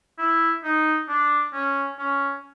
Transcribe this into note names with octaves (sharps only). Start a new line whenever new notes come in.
E4
D#4
D4
C#4
C#4